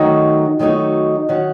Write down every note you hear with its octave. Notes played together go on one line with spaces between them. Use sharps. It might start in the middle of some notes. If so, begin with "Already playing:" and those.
Already playing: D#3 F#3 A3 D#4 F#4
D#3 F#3 A3 D#4 F#4
D#3 F#3 C#4 F#4